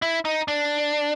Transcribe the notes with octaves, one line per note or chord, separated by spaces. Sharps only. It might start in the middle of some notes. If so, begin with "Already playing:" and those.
E4
D#4
D4